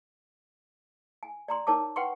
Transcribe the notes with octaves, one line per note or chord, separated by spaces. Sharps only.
G#5
D5 A#5 C6
D#4 A#4 C#5 A5 D6
B4 F#5 G5 C6 C#6